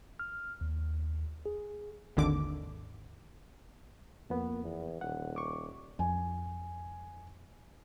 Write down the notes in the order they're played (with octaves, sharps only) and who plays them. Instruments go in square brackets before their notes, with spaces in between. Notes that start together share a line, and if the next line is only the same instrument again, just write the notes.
[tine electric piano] F6
D#2
G#4
[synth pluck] G#1 D#2 D3 D6
[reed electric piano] F2 B3 [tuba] A#3
[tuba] E2
[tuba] D#1 [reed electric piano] F#5
[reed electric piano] C#6 D6
[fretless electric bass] F2 [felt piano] G#5